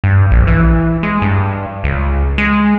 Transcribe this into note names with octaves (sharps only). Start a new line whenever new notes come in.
G2
A#1
E3
G#3
G2
C#2
G#3